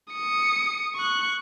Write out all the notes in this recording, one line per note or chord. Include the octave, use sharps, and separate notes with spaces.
D#6 C#7
C#6 F#6